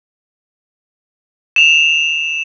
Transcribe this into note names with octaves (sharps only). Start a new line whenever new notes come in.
E7 F7